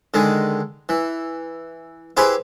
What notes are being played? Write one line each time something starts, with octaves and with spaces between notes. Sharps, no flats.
D3 D#3 G#3
E3
E4 G4 G#4 B4 C5